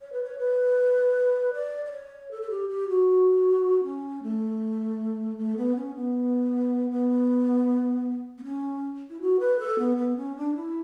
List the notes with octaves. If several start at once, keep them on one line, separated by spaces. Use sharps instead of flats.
C#5
B4
C#5
B4
D5
D5
C#5
A4
A4
G4
G4
F#4
C#4
A3
A3
B3
C#4
B3
B3
B3
C#4
E4
F#4
B4
A4
B3
B3
C#4
D4
E4